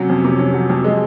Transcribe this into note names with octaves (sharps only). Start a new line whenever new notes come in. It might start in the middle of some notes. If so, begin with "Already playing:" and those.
Already playing: C3 F#3 C#4
F2
C3
C#4
F#3
F2
G#3